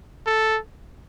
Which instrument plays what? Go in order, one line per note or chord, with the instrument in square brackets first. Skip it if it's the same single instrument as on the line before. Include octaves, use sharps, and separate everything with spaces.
[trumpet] A4